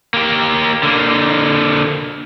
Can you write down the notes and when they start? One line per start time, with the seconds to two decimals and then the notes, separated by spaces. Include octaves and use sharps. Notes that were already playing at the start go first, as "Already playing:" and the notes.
0.14 A#3 G4
0.83 D3 A#3